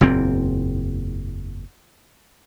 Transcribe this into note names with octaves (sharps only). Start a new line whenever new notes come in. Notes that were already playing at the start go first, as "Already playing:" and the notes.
F#1 E2 A#2 C4